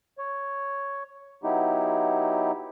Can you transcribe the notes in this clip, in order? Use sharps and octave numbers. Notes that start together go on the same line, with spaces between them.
C#5
F#3 B3 D#4 E4 G4